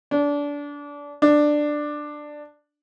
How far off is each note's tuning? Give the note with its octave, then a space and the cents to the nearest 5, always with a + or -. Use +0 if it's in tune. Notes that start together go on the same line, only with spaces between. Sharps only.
D4 -25
D4 +10